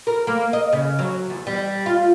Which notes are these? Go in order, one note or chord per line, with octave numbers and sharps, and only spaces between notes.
A#4
A#3
D#5
C#3
F#3
E2
G3
F4